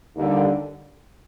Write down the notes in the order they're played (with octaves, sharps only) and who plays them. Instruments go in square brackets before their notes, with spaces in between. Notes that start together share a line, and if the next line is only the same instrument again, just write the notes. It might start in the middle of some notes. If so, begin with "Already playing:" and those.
[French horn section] D#2 D3 G3